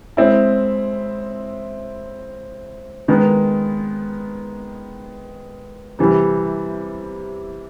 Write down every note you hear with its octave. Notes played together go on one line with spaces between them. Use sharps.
G#3 C4 E4
D#3 G#3 B3
C3 E3 G3